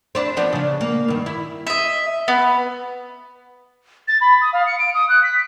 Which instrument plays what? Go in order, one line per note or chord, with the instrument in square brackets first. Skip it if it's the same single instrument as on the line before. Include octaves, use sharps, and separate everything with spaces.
[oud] C4 D4 E4
F3 B3 D4
C#3 D4
A#3
G2 D#3
E4
[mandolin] D#5 E5
B3
[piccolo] A6
B5
D#6
F5
C#7
D7
D#6
F#6
B6